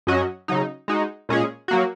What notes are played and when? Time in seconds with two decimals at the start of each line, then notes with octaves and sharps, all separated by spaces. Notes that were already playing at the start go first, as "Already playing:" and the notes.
0.07 F#2 F#3 C#4 F#4 D#5
0.48 C#3 F#3 D#4
0.88 G#3 D#4 F#4
1.29 A#2 G#3 C#4 G#4
1.68 F#3 A#3 F#4